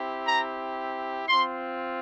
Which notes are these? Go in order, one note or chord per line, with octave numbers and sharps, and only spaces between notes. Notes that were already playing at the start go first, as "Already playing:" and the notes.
Already playing: C4 E4 G4
A#5
C4 F4 C6